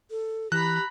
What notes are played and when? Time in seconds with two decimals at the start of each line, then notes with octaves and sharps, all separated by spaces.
0.10 A4
0.52 E3 G4 A#5 B5 F#6